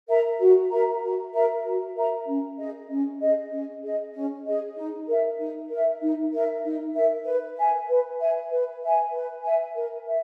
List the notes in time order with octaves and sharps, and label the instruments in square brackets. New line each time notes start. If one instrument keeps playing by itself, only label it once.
[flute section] A#4 E5 A#5
F#4
A#4 E5 A#5
F#4
A#4 E5 A#5
F#4
A#4 E5 A#5
C#4
G#4 D#5
C#4
G#4 D#5
C#4
G#4 D#5
C#4
G#4 D#5
D#4
A#4 E5
D#4
A#4 E5
D#4
A#4 E5
D#4
A#4 E5
B4
E5 G#5
B4
E5 G#5
B4
E5 G#5
B4
E5 G#5
A#4
E5